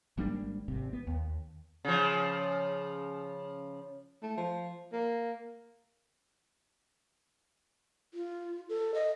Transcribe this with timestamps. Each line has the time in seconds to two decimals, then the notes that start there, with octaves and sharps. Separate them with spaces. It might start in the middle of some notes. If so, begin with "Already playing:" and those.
0.18 G#1 G3 A#3 D4
0.68 G#1 C3
0.93 B3
1.07 D#2
1.85 C#3 F3
4.22 A3
4.37 F3
4.92 A#3
8.14 F4
8.69 A4
8.94 D#5